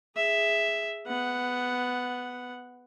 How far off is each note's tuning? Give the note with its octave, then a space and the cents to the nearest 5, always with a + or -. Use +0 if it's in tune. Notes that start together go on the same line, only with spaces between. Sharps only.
G#4 +0 E5 +0
B3 +10 F#5 +0